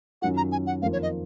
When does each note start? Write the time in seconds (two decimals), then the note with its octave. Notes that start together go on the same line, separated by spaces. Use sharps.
0.22 F#2 D#3 F#3 C#4 F4 F#5
0.37 A#5
0.52 G#5
0.67 F#5
0.82 F2 D#3 A#3 F4 F5
0.93 C#5
1.02 D#5